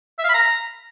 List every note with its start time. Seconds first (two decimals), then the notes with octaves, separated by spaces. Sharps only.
0.19 E5
0.24 F5
0.29 B5
0.34 A#5